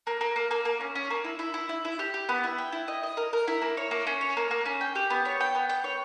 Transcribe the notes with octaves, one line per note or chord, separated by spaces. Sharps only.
A#3
A#3
A#3
A#3
A#3
C#4
C#4
A#3
E4
E4
E4
E4
E4
G4
G4
B3
E4
G5
E4
D#5
D#5
A#4
A#4
E4
A#3
C#5
A#3
C#4
C#5
A#3
A#3
C#4
G5
G4
B3
C#5
G5
B3
G5
C#5